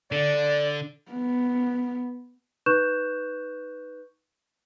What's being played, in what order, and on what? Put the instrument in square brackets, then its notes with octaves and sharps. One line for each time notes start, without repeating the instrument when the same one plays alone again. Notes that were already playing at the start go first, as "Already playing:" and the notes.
[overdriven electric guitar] D3 [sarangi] D5
[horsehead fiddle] B3
[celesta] D#4 B4 C#6 F#6 G6 E7